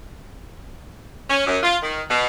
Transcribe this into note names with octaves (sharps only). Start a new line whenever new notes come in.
C#4
F#2
F4
D#3
B2